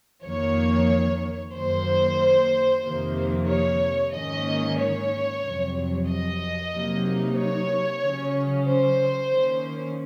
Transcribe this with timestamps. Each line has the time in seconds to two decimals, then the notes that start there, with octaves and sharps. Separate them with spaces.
0.24 F2 D#3 A#3 C#5
1.54 F#2 D#3 A#3 C5
2.84 F2 C3 D#3 A#3 D#4
3.49 C#5
4.14 G#2 D#3 A#3 C#4 D#5
4.78 C#5
5.43 F2 C3 F#3
6.07 D#5
6.72 C3 F#3 A#3 D#4
7.37 C#5
8.02 C#3 F#3 C#4
8.66 C5
9.31 D#3 A#3 C#4